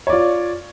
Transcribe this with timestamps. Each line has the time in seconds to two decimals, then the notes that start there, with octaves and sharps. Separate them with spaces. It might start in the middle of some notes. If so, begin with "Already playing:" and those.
0.07 C#5
0.10 D5
0.13 F4